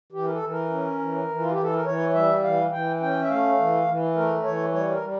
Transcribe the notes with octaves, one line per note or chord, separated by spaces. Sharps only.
E3 G4
A#4
A4
E3
A#4
C#4
E3
E3
F4
G4
E3
A4
A#4
E3 C#5
G3 E5
E3 F5
E3 G5
C#4 G5
E5
A3 F5
E3
E3
A3 A#4
E3 C#5
G3 C#5
A#4
G3